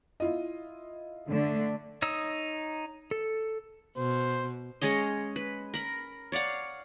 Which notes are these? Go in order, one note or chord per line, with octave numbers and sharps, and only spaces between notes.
E4 F4 D#5
D3 A3 D4
D#4 C#5 D#6 E6
A4
B2 C5
G#3 C#4 C#5 D#5
B4
A#4 B5
C#5 D5 F5 F#5